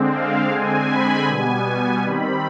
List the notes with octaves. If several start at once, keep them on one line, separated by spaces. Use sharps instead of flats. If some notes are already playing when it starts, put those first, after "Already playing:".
Already playing: D3 G#3 C4
F5
D3 G#3 C4 G#5
B5
B2 G3 B3 G#5
D#3 G3 C4 B5